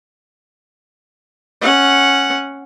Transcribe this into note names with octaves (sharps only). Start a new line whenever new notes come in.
C#4 F#5